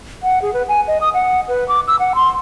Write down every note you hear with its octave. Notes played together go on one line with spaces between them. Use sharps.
F#5
G#4
B4
G#5
D#5
D#6
F#5
B4
D6
E6
F#5
C6